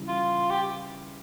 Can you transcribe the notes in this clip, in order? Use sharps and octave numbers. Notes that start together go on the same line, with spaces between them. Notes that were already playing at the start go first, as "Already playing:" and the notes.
Already playing: C#3 E3 G3
F4
G4